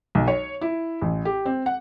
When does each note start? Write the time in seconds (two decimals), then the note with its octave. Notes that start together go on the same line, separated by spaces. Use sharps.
0.15 B1
0.28 C#5
0.61 E4
1.01 A1
1.25 G4
1.46 C4
1.66 F#5